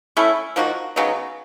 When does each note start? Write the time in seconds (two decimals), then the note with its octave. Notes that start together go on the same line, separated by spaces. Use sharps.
0.17 A3 C#4 E4
0.56 F3 A#3 D#4 F#4
0.96 C#3 F#3 B3 D#4